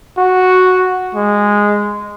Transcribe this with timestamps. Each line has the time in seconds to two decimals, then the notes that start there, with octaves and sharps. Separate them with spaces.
0.18 F#4
1.15 G#3